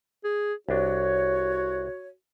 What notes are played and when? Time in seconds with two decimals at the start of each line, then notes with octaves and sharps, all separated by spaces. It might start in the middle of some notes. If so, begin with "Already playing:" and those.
0.24 G#4
0.69 C2 D4 F#4 C#5